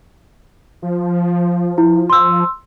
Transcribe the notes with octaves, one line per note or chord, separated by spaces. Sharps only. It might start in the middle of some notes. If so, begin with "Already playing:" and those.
F3
E4
C6 E6